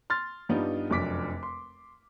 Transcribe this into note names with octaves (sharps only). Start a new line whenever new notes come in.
C6 F6 A6
G2 G3 B3 D4 D#4 F4
F1 F#2 D4 D6 B6
C6